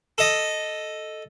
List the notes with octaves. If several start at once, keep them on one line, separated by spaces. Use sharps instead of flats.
A4 D#5